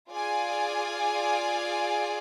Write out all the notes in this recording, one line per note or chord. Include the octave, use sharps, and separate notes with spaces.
F4 G#4 D5 F5 G#5